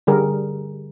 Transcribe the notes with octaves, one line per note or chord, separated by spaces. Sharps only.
D3 G3 G#4 A#4